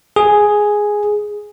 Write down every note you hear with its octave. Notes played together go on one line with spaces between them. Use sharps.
G#4